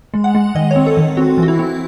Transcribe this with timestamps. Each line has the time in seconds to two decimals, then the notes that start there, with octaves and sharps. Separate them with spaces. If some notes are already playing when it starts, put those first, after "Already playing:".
0.14 G#3
0.24 F#5
0.35 G#3
0.55 D#3 D#5
0.71 C#5
0.76 C4
0.86 A4
0.97 D#3
1.17 C4 F#4
1.37 E3
1.43 F#4
1.48 E4
1.59 C4